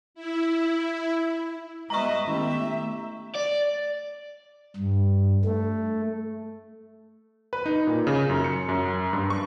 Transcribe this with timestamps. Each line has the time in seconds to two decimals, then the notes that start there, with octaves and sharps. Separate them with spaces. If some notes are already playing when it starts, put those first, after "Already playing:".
0.14 E4
1.90 G3 G#3 B3 B4 D#5 E5 A#5 C#6
2.27 D#3 A3 B3 C#4 E4 G4 E5
3.36 D5
4.76 G2
5.45 A3
7.53 B4
7.66 D#4
7.87 A#2
8.07 C#3
8.30 F#2
8.44 C#7
8.69 F#2
9.13 G2
9.30 C#6